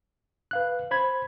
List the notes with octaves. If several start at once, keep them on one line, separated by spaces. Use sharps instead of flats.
B4 F5 F#6
C5 B5 G#6